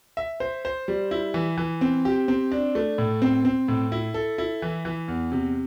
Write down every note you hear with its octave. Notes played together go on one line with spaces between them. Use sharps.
E5
C5
C5
G3
E4
E3
E3
C4
G4
C4
D4
A3
A2
C4
C4
A2
E4
A4
E4
E3
E3
E2
C3